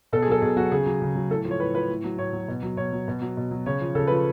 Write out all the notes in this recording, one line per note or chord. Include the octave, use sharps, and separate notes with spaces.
B2 A4
G#4
F#3 A4
B2 G#4
F#3 F#4
C#3 G#4
F#3
C#3
F#3
A2 A4
F3
C#5
A2 B4
F3 B4
A2
F#3
A2 C#5
F#3
B2
F#3
B2 C#5
F#3
B2
F#3
B2
F#3
C#3 C#5
F3
C#3 A4
F3 B4